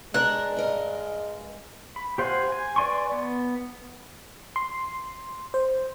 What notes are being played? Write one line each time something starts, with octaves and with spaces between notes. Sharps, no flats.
G#3 D4 A#4 F#6
G2 A#4 D#5
B5
G4 C5 F5 F#5 G#5
G#5
B4 D5 G#5 C6 C#6
B3
C6
C5